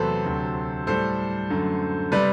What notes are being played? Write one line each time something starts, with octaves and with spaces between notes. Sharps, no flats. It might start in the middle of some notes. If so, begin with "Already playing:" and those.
Already playing: E2 C3 F#3 A3 A4 B4 C5
D2 C3 F#3
A2 G3 A4 C5
F#2 D3 A3
C3 G3 B4 D5